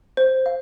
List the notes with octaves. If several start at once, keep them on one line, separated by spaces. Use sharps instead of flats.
C5
F5